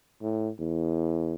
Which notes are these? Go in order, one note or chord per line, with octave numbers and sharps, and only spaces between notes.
A2
E2